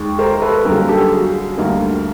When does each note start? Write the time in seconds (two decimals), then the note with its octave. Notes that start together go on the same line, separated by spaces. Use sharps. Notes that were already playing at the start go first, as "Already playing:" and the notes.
Already playing: D#2 D#3 G#3
0.19 A#4 C5
0.42 A4 B4
0.65 F#2 D3 G3 A#3 G#4 A#4
0.88 G4 A4
1.11 F#4 G#4
1.58 D2 D3 G3 A#3